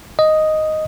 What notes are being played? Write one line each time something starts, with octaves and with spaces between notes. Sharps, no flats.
D#5